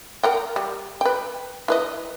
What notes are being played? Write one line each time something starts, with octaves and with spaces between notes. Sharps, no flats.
A#4 F#5 G5
G3
B4 G5
E4 B4 D#5